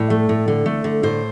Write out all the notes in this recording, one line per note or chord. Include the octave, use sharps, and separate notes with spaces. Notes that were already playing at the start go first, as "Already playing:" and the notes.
Already playing: A2 D5
A3
A2
D3
A3
D3
A2 C5